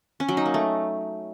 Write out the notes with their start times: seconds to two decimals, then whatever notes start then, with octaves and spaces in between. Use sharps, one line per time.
0.20 C#4
0.29 F#3
0.37 D#4
0.46 A#3
0.54 A3